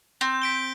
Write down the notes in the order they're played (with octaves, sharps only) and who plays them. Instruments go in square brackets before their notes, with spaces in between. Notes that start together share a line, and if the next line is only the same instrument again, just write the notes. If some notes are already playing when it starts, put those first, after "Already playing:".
[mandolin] C4 [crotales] G6
[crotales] B6 D7 G7